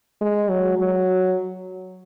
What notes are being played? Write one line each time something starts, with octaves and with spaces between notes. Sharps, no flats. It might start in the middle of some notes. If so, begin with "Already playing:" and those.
G#3
F#3
F#3